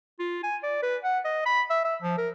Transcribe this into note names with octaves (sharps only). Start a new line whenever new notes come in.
F4
G#5
D5
B4
F#5
D#5
B5
E5
E5
F3
A#4